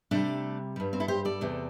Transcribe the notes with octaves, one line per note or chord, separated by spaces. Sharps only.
C3 G3 A3 D4
G2 G3
C4
E4 A4
G4 C5
A4 D5
E2 C3 A3